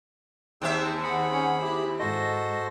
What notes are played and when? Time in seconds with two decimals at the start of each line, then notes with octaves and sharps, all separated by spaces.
0.62 D#2 C4 G#4 E5 G5 E6
1.04 G#4 F#5 B5
1.32 C#4
1.63 E4 G4
2.00 G#2 F#4 A4 C5 D#5 A#6